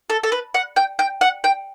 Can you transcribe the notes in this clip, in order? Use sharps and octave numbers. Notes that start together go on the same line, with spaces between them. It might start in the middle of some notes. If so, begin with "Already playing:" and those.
A4
A4
B4
F#5
G5
G5
F#5
G5